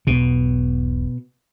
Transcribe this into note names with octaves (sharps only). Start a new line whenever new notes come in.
E1 B1 B2 B3